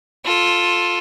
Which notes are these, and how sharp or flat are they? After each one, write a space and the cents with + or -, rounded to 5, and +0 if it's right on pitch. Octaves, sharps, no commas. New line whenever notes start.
F4 +10 A4 +0